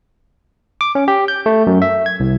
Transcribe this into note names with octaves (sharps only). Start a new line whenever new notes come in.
D6
C#4
G4
G6
A3
F#2
E5
G#6
C2